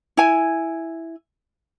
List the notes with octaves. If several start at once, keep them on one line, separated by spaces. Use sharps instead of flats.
E4 G#5